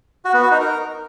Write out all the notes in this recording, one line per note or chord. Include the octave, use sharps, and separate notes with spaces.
F#4
B3
F#4
D#4
A#4